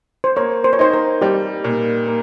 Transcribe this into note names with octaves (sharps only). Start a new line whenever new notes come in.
C5
A#3 C#5
C5
C#5
D#4 C5
A#4
G3 G4
A#2
A#3